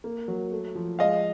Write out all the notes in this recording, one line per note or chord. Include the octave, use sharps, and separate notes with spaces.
A#3
F#3
A3
F3
G#3 D#5 F5